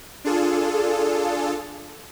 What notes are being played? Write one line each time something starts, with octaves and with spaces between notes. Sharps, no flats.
D4 F4 G#4 A4